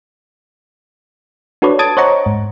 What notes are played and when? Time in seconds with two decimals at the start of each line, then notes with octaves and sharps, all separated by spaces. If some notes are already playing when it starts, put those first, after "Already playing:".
1.62 D4 F#4 A4 B4 C#5 D5
1.79 A5 D#6 G#6 A6 D7
1.97 C5 C#5 D#5 F#5 A#5 C#6
2.26 G#2